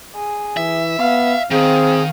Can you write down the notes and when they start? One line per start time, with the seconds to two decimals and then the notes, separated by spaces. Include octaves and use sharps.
0.15 G#4
0.57 E3 E5
0.99 B3 F5
1.51 D#3 C4 G#4 F5